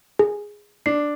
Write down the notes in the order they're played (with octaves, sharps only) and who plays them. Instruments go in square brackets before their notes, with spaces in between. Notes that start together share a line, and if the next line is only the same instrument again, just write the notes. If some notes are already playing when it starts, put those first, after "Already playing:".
[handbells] G#4
[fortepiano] D4 [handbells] C7